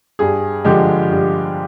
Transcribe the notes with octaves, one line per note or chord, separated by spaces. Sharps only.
G2 G#4
D3 F3 G#3 G4
G2